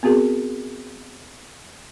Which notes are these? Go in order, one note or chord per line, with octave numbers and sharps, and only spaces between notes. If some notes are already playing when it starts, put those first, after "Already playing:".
B3 C4 F#4 G#4 A#4